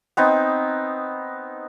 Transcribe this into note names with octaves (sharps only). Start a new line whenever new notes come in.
B3 C4 D#4